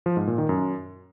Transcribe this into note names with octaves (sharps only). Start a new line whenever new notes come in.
F3
G#2
A#2
D#3
F#2